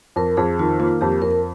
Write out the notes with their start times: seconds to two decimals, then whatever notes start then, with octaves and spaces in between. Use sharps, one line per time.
0.16 F2 A#4
0.37 F2 G#4
0.59 D#3 F4
0.79 A#3 F4
1.01 F2 G4
1.22 F2 A#4